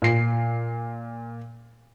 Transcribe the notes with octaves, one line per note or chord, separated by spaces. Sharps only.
A#2 C7